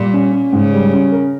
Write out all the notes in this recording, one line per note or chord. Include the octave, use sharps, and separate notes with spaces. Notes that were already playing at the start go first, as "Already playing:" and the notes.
Already playing: A#2 G3
C#4
C#4
G#2 C#3
G3
C#4
A#4